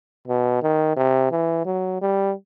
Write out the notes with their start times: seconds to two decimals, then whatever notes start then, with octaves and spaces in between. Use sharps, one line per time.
0.28 B2
0.63 D#3
0.97 C3
1.32 E3
1.66 F#3
2.01 G3